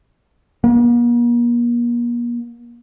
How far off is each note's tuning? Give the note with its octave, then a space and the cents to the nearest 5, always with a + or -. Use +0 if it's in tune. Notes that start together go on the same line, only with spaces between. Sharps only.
A#3 +40